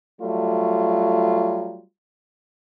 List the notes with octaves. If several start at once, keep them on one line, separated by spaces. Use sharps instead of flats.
F#3 G3 A3 F4